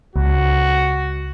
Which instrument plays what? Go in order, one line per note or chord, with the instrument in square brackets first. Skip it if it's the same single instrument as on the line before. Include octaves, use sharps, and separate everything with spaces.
[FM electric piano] C#2 [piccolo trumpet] F#4